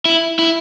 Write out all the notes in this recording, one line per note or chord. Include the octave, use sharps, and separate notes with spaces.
E4
E4